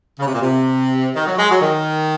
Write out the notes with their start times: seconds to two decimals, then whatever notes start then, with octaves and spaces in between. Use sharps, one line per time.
0.19 C#3
0.27 C3
0.34 A#2
0.42 C3
1.15 D#3
1.27 F#3
1.39 G#3
1.50 F#3
1.62 D#3